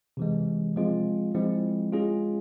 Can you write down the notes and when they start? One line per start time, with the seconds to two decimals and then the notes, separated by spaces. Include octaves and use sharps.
0.17 C3 E3 G#3
0.76 F3 G#3 C4 F4
1.34 F3 G#3 C4 E4
1.93 G#3 C#4 F4 G#4